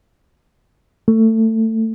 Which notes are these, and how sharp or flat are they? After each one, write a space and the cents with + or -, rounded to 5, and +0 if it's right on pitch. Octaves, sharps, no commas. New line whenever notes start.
A3 +20